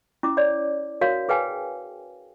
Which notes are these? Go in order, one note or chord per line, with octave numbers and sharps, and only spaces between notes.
C#4 E4 D6
C#5 D5
F#4 A#4 C#5 F5
G#4 B4 F5 G5 G#5